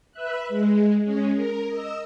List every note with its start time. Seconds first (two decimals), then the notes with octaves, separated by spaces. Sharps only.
0.12 B4 E5 F#6
0.49 G#3
1.04 G#3 C#4
1.34 A#4
1.68 D#5 E6